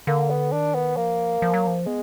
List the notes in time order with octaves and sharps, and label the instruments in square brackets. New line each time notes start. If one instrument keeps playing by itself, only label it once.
[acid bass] D3 [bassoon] A#3
[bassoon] B3
[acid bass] D#3 [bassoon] D4
[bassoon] B3
[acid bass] F3 [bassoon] A#3
[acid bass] F3
F#3
F3
[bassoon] G#3 [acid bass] B3